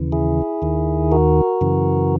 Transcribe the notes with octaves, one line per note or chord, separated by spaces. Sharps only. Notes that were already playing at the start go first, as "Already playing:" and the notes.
Already playing: D#2 C#3 E3
E4 G#4
D#2 D#3
F#4 A#4
F#2 C#3 E3